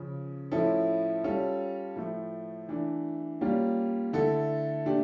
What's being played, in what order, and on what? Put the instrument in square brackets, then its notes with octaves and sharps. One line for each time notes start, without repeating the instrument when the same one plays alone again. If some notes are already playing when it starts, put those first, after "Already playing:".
Already playing: [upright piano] C#3 F3 C#4
A2 F3 C#4 E4 A4
G3 C#4 F4 A4
A2 F3 A3
E3 A3 D4
G3 A#3 C#4 F4
D3 A3 E4 A4
A#2 A3 D4 G4